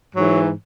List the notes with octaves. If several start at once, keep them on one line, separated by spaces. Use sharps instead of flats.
G#2 E3 F#3